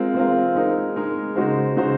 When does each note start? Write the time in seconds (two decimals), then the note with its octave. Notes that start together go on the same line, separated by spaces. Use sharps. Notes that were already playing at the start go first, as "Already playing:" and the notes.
Already playing: G#3 C4 F4 A#4
0.14 G#3 C4 F4 A#4
0.56 G#3 D#4 A#4
0.96 G#3 D#4 A#4
1.36 C#3 G#3 D#4 F#4 C5
1.77 C#3 G#3 D#4 F#4 C5